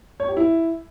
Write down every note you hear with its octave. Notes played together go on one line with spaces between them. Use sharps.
C#5
G4
E4